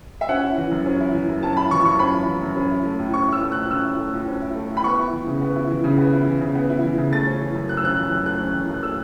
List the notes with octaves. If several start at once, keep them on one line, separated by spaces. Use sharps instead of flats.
E5
C#4 F#5
E4
E3
F#2
C#4
E4
E3
F#2
C#4 A5
E4 B5
E3 C#6
F#2 C#6
C#4 B5
E4
E3
F#2
C#4
E4
A3
A2
C#4 C#6
E4 E6
A3
A2 F#6
C#4 E6
E4
A3
A2
C#4
E4
A3
A2
B5
B3 C#6
E4
E3
C#3
B3
E4
E3
C#3
B3
E4
E3
C#3
B3
E4
E3
C#3
A3 A6
C#4
E3
F#2
A3 F#6
E6
C#4 F#6
E3
F#2
A3 F#6
C#4
E3
F#2
F#6
A3 E6